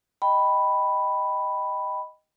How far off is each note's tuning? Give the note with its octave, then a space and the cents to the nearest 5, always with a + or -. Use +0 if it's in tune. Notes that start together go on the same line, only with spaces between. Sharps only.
D#5 +0 G5 +0 B5 +0